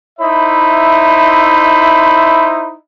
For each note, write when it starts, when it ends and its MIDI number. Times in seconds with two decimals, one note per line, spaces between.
0.19 2.74 63
0.19 2.74 64
0.19 2.74 72
0.19 2.74 76
0.19 2.74 83